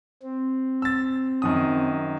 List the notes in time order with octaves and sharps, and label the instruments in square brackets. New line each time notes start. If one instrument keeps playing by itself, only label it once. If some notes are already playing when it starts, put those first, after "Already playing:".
[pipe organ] C4
[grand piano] E6 A6
F#2 D#3 D#6